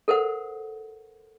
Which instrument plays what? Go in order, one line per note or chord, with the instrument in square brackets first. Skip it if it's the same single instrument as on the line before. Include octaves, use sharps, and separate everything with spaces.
[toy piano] A4 A#4 C5 F#5